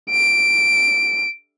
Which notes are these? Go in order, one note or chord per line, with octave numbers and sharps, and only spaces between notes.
D7